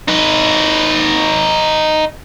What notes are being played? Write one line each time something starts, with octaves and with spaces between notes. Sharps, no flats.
D#4 B4